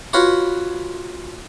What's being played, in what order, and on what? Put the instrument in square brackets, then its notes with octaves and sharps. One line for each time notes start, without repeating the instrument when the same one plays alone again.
[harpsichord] F4 F#4 B4 C#5